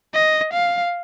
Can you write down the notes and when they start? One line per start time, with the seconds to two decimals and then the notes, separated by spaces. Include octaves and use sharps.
0.14 D#5
0.53 F5